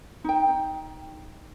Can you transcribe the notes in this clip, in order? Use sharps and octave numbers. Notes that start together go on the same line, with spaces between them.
D#4 G5